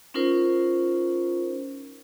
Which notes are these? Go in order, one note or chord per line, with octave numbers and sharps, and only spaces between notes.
C#4 D#4 F4 A#4 C5